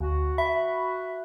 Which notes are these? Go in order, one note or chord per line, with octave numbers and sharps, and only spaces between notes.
D2 F#4
E5 B5